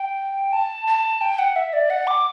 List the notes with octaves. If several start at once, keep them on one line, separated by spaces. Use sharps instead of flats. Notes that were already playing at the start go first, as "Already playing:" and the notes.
Already playing: G5
A5
A5
G5
F#5
E5
D5
F#5
D6